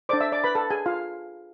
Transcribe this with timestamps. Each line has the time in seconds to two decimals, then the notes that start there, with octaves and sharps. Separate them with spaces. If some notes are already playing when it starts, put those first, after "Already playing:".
0.09 D4 A4 C5 D5 D6
0.21 E5 E6
0.32 D5 D6
0.44 B4 B5
0.55 A4 A5
0.70 G#4 G#5
0.86 F4 F5